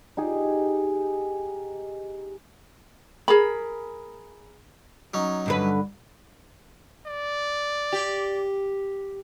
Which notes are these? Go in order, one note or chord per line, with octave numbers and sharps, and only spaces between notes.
D#4 G4 G#4
G#4 A#4 B5
F#3 C#4 D#4
G2 D3 B4
D5
G4